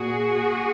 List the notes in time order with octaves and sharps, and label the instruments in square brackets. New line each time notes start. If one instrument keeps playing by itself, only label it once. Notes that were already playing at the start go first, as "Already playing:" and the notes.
Already playing: [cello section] A#2 F#4 G#4